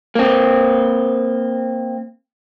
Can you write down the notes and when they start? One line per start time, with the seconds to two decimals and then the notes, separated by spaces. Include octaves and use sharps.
0.15 A#3 C4